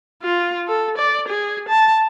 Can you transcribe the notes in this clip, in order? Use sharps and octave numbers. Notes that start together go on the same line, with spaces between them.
F4
A4
D5
G#4
A5